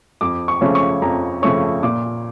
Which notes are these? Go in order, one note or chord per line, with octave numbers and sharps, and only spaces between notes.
F2 D6
C#6
C#3 F3 A3 C#4
C#6
F2 A#5
C#3 F3 A3 C#4 C#6
A#2 D6